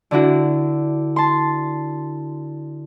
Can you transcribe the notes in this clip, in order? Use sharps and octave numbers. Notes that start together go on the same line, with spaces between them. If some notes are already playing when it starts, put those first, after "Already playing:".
D3 D4 E4 F#4
A5 C6